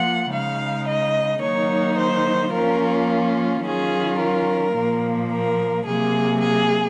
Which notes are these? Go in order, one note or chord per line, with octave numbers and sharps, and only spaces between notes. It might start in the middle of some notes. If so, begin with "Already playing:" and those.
Already playing: F3 A#3 F4 F#5
C#3 G#3 D#4 F5
D#5
D#3 F#3 A#3 D#4 C#5
C5
F3 A#3 C#4 F4 A#4
D#3 F#3 C#4 F4 G#4
A#4
A#2 F3 A#3
A#4
C3 F#3 A#3 G#4
G#4